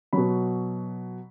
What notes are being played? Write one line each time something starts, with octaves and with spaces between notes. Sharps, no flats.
B2 F#3 B5